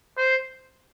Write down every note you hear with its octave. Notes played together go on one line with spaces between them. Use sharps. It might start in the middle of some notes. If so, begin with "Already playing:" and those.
C5